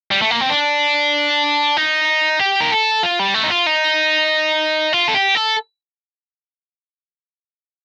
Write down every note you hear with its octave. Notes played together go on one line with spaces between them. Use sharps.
G3
A3
A#3
C4
D4
D#4
G4
A#4
A4
F4
G3
A3
D#4
F4
D#4
F4
A4
G4
A4